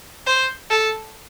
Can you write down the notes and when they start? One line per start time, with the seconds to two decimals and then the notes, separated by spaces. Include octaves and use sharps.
0.26 C5
0.70 A4